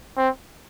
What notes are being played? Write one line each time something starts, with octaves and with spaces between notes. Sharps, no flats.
C4